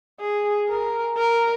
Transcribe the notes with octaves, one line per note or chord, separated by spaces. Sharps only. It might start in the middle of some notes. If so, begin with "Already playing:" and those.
G#4
A#4
A#4